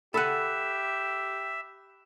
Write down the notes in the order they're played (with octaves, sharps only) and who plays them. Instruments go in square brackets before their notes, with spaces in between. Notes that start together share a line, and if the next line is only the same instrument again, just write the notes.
[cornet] G4 [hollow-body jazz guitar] A4 F#5 [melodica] E5 [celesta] B5 E6 F#6